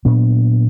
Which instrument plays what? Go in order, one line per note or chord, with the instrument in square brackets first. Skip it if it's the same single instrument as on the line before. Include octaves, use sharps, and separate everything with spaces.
[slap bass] A#2 F#3 B3 D4